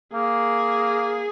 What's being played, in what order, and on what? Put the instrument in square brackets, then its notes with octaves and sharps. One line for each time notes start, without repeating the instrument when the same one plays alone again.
[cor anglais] A#3 [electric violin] G#4